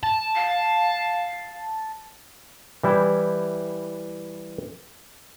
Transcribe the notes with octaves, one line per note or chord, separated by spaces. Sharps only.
A5
F5
E3 G3 E4